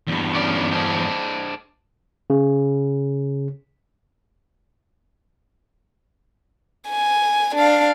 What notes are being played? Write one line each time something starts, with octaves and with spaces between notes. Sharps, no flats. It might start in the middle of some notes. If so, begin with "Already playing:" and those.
E2 G2
C#4 D5
D4 C5 D#5
C#3
G#5
D4 F5